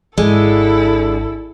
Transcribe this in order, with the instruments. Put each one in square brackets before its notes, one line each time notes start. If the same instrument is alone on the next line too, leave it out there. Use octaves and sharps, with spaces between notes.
[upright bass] G#1 [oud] D3 [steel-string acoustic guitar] G#3 [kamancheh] E4 A4